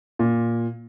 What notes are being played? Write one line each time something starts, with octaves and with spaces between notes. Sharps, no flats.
A#2